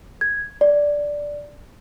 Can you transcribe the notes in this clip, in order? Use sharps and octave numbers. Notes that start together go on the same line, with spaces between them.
G#6
D5